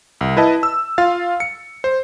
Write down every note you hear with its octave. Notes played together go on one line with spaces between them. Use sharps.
C2
E4 B4 D#5 A5
E6
F4 F5 A6
C#7
C5